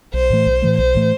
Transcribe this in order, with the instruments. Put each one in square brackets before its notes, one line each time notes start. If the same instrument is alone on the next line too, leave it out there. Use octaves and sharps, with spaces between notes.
[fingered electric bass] B1 [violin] C5
[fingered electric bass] A2 E3 A3
B1
A2 E3 A3
[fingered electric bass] B1 [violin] C5
[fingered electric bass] A2 E3 A3